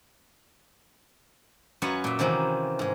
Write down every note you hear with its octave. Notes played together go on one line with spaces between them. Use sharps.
F#2 F4 B4 C#5 F#5 G#5
A#2 E5
C3 D#3 E3 A#3 C4 C#4
G#2 G#4